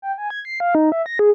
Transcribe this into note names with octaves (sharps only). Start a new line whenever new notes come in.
G5
G#5
G#6
C7
F5
D#4
E5
A#6
G#4